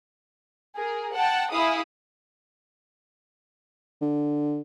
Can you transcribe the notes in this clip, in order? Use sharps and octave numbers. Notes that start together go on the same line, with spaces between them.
G#4 A#4
F#5 G5 A5
E4 G#4 F5 D#6
D3